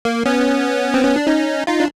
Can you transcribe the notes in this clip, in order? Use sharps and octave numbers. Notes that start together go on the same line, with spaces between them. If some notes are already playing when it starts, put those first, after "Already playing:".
A#3
B3 C#4
C4
C#4
D4
C#4 D#4
D#4 F4
D4